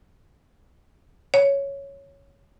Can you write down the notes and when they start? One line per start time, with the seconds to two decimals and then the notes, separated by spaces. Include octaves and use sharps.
1.34 C#5